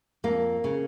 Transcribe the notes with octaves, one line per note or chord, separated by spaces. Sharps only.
F2 A#3
C#3